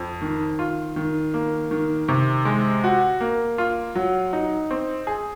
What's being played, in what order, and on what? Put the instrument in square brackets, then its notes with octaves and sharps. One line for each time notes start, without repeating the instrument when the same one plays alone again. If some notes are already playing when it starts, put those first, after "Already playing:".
Already playing: [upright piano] F2
D#3
F4
D#3
A#3
D#3
C3
G#3
F#4
A#3
F4
F#3
D#4
C4
G#4